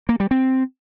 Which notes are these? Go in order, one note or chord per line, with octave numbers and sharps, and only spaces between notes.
A#3
G3
C4